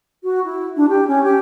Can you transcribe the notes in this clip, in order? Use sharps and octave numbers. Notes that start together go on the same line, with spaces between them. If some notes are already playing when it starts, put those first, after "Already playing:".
F#4
E4
D4
G4
C#4
G4